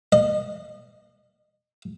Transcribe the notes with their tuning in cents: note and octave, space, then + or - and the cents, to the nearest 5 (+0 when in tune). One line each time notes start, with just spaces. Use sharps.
D#5 -35